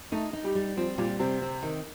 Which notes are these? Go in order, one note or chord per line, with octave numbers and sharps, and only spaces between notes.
A3 D#4
D#4
G3
G3
F3 C4
A#2 G3
C3 C4
C4
D#3